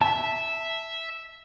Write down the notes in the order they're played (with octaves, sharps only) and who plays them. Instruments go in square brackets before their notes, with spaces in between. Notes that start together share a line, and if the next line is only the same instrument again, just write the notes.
[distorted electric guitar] E5 [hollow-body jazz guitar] A5